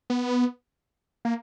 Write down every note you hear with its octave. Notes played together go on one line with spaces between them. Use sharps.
B3
A#3